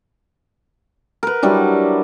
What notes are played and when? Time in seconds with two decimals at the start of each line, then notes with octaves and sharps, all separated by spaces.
1.23 A#4 B4
1.42 F#3 G3 D4 E4